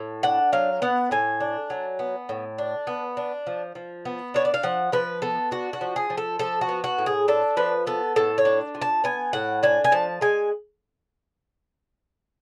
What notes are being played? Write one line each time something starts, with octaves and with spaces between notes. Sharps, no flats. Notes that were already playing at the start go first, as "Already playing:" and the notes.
Already playing: A2
D4 F#5
F#3 F5
B3 F#5
A2 G#5
D4
F#3
B3
A2
D4
B3
D4
F3
F3
B3
D4 C#5
D5
F5
F3 F#5
F3 B4
B3 A4
D4 F#4
F#4
F3
G#4
F3
A4
F3 A4
F#4
B3
F#4
A2
G#4
D4 A4
F3 B4
B3 A4
A2 A4
C#5
D4
F3
A5
B3 G#5
A2 F#5
D4 G#5
G#5
F3 A5
G#3 G#5